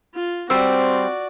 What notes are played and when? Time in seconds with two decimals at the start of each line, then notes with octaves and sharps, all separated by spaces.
0.15 F4
0.50 G3 C4 F#4 C5 D5 E6